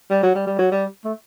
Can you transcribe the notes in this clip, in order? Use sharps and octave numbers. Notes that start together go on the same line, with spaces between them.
G3
F#3
G3
G3
F#3
G3
A3